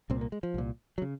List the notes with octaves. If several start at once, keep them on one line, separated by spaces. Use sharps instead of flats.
C2 A#2 C4
A#3
G#3
F3
C2 A#2
F#3
C#3